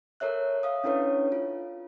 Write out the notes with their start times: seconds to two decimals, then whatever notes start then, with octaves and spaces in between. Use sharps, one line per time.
0.20 A4 A#4 C#5 E5 F#6
0.63 F5 D#6
0.84 C#4 D4 E4 A4 B4 C#5
1.32 F4